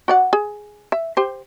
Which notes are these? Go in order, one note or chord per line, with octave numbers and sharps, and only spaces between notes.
F#4 D5 F#5
G#4
E5
G4 C5